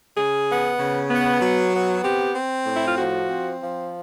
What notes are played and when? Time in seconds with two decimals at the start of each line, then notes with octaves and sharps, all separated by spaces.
0.17 C#3 G#4
0.48 B3
0.79 C#3
1.11 B3
1.41 F#3
1.73 B3
2.04 C4 G4
2.35 C4
2.66 A2
2.77 E4
2.87 F4
2.97 F3 F#4
3.29 C4
3.60 F3